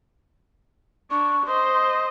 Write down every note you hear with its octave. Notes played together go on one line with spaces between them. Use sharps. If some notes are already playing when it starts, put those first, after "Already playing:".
D4 C#6
C5 D#5 C6